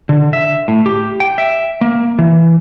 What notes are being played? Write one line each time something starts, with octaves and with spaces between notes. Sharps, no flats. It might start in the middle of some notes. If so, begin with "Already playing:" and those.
D3
E5
A2
G4
G5
E5
A#3
E3